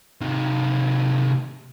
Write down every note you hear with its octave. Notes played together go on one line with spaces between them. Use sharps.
C3 D#3